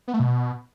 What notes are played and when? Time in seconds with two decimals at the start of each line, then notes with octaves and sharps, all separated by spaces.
0.08 B3
0.14 A3
0.20 B2